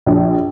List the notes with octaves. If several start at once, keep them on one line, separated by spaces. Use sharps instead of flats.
A#1